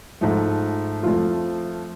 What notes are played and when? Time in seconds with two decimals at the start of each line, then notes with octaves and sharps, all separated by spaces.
0.21 G#2 F3 A3
1.03 F2 F3 A3 F4